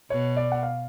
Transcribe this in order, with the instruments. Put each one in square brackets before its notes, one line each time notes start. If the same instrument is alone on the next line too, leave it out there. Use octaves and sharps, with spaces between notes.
[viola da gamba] B2 [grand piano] C#5
[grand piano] D5
F#5
F5